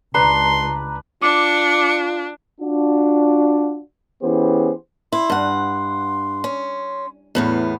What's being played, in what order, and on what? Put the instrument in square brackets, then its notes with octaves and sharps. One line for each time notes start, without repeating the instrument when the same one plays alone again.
[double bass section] C#2 [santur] D4 B4 [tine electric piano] A#5 [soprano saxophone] C6
[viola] D4 [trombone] F4 [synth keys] D6 [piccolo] C#7
[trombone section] D4 F4 F#4
E3 B3 C#4 G4 G#4 C5
[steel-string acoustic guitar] E4 [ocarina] C6
[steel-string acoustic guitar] G2 F#5
C#4
E2 A2 B3